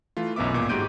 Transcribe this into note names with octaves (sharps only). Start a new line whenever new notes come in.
E3 A3 F4
B1 F#2 B3 E5 D6
G#1 A#2 D6
G#2 F#4 G4 G6 D7 D#7